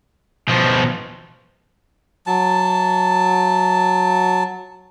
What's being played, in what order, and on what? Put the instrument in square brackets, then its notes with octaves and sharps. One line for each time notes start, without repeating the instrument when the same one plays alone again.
[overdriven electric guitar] B2 F3
[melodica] F#3 A5